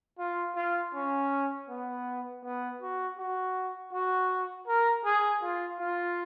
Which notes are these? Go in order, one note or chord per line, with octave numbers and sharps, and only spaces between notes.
F4
F4
C#4
B3
B3
F#4
F#4
F#4
A#4
G#4
F4
F4